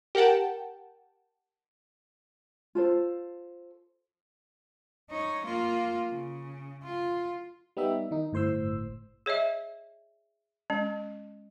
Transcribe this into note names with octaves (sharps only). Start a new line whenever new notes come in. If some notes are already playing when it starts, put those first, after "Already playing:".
G4 A#4 F#5 G5 A5
F4 A4 C5
D#4 C#5
A#3 F4
C#3
F4
G3 B3 D#4 G4 E5
D#3 D#4
G1 A2 C5 C6 E6
G#4 C#5 D#5 E5
G#3 C#4